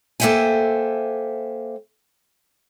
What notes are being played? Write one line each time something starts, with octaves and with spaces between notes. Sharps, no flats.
A#3 A4 C5 E5 G5 G#5